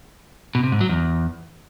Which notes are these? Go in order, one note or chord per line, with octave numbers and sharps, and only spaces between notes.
B2
C3
G#2
F#3
E2